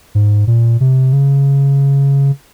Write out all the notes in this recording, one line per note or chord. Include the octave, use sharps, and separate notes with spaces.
G#2
A#2
C3
C#3